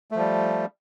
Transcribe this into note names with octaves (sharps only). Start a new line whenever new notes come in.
F3 G3 A3